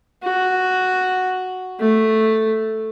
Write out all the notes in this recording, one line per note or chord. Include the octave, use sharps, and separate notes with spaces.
F#4
A3